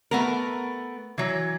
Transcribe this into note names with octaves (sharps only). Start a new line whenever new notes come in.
A3 B3 A#4
E3 F#3